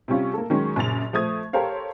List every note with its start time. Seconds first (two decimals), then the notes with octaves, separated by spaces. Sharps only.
0.08 C3 G3 C#4 F4
0.34 A#3 A4
0.50 D#3 F#3 G#3 C#4
0.76 A#1 F#2 C#3 A6 F7
1.13 F3 A3 D#6 G#6
1.53 G4 A4 A#4 C5 C#5 F5